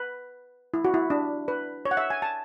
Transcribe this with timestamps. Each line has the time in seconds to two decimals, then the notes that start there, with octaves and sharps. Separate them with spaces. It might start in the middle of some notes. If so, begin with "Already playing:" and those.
Already playing: B4
0.74 E4
0.85 F#4
0.94 E4
1.10 D4
1.48 B4
1.85 C#5
1.91 F#5
1.97 E5
2.10 G#5
2.22 A5